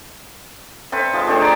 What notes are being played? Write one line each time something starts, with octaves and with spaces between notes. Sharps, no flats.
C4 A4 B4 E5
F3 G#3
A3 C4 D4 G#4
B4 A5 A#5 D6